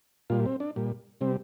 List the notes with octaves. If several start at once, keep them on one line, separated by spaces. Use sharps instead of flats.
A#2 G3 F4
C4
D4
A#2 G3
C3 G3 C4